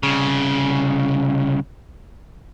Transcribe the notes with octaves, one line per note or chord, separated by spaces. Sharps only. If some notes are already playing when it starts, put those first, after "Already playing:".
C2 C#3